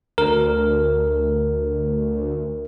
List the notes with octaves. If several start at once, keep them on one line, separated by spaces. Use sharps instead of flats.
D2 A#4